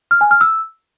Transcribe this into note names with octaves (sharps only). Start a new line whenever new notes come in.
F6
G#5
F6
E6